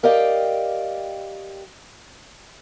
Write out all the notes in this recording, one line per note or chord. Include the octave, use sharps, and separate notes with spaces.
G4 A#4 D5 D#5 F5 G5